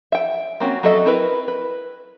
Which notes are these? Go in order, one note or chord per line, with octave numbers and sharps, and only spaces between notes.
E5 G5
A#3 C4 C#4 F#4
F#3 F#4 A4 D#5 E5
C4 E4 A#4 B4
B4